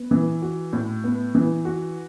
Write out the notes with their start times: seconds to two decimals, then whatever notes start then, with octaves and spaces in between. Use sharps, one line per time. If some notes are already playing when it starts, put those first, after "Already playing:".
Already playing: B3
0.11 E3
0.42 F#4
0.73 A2
1.04 B3
1.35 E3
1.65 F#4